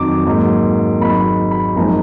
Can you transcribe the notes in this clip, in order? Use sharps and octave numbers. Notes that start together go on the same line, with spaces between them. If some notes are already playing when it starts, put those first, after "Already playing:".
Already playing: F2 D#3 F#3 D6
G#2 F#3 A#3
G#1 G#2 F#3 B5
B5
G#1 F#2 F3 G#3 D#4 A#5